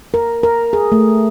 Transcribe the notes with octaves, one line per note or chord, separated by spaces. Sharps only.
A#4
A#4
G#4
A3